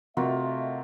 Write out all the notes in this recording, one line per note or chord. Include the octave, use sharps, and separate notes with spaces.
C3 A3 F4 F#4 A#4 D#5 E5